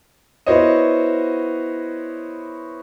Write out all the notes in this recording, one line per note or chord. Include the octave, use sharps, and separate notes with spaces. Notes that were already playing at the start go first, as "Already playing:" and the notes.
B3 E4 F#4 C5 C#5 D#5